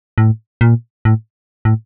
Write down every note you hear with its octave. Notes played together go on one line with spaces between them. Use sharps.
A2
A#2
A2
A2